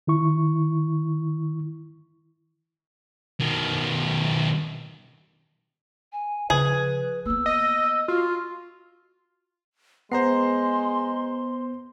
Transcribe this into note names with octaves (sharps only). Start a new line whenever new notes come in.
D#3 E4 C#6
B2 D#3
G#5
C#3 F3 G#4 B4
A#3 B3 E6
D#5
F4 F#4
G#3 B3 C5 A#5 C6 C7